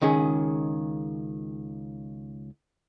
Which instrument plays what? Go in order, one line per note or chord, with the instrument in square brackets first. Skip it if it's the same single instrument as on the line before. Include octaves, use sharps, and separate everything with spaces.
[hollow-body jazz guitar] C#2 D#3 C#4 G#4